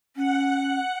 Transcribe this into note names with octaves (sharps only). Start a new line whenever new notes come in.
C#4 F#5